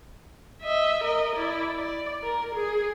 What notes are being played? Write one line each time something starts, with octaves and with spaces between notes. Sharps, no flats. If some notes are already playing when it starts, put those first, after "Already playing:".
D#5 E5
A#4 D#5
E4 D5
D5
A#4
G#4